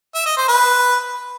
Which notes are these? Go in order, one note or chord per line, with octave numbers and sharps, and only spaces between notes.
E5
D#5
C5
B4